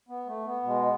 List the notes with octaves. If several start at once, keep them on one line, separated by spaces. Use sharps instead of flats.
B3
A3
B3
B2 G#3